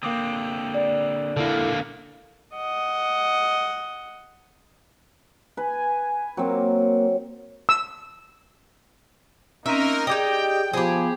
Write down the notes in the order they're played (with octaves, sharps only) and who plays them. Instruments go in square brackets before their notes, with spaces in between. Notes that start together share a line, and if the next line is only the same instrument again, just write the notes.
[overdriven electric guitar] D3 C4 [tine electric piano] A#3 D6 D#6
[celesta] D5
[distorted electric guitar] D3 A#3 [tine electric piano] E4 A4
[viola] D#5 F#5
[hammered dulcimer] B4 [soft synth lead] G#5
[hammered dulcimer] F#3 C4 [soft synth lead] A#3
[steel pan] E6
[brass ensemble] A#3 D#4 A#4 [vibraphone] C4 C#4 [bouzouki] E5
[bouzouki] D#4 G4 D#5 [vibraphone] G#4 D5 [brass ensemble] G5
[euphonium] F3 [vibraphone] B3 C5 [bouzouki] G4 G#4